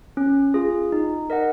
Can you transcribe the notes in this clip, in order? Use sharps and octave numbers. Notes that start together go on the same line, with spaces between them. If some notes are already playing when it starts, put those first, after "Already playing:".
C#4
F4 G#4
D#4
A#4 D#5 F#5